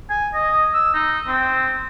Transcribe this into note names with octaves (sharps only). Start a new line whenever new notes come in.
G#5
D#5
E6
D#4
C4